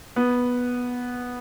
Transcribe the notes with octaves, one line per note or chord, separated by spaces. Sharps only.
B3